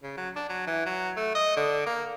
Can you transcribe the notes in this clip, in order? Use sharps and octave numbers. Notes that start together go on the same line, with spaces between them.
C#3
F#3
D4
F#3
E3
F#3
A3
D#5
D3
A#3